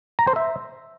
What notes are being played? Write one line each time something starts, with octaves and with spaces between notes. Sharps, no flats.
A#5
C5
E5